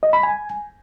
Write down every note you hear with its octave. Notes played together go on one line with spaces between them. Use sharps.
D#5
B5
G#5